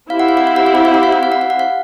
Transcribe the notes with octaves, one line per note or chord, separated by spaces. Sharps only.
C4 E4 G4 F5
F#5
F5
F#5
F5
F#5
F5
F#5
F5
F#5
F5
F#5
F5
F#5
F5
F#5
F5